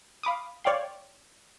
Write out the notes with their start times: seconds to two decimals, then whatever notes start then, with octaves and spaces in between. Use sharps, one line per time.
0.23 F5 B5 D6 D#6
0.64 C#5 D5 F5 G5 C6